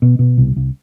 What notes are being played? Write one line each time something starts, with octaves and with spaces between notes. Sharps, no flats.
B2
B2
C2
C2